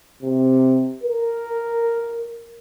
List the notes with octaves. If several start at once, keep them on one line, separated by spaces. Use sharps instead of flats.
C3
A#4